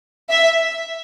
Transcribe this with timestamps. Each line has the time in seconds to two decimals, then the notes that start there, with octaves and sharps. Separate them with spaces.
0.30 E5